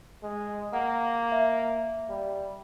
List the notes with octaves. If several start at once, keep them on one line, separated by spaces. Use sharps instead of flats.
G#3
A#3 F#5
E5
G3